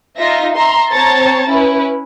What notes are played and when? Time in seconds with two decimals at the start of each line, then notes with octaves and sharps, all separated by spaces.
0.18 D#4 F4 E5 A#6
0.55 E5 A#5 C6
0.92 C4 C#5 A5 A#5 A6
1.48 C#4 E4 B4